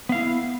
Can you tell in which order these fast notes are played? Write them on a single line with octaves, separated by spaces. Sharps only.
B3 F5 E4